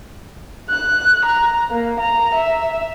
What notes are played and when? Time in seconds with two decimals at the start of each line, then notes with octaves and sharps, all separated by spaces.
0.70 F#6
1.25 A#5
1.71 A#3
2.00 A#5
2.35 E5